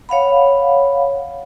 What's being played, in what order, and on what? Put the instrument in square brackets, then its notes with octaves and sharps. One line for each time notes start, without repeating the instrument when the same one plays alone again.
[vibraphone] C#5 F5 F#5 B5